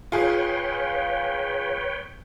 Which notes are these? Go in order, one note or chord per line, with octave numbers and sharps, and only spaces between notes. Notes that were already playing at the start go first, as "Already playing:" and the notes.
F4 G#4 B4 C#5 G5